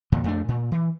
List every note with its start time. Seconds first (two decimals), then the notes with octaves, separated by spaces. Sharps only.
0.12 E2 A#2 D3
0.24 F2 A3 D4
0.48 A#2
0.72 E3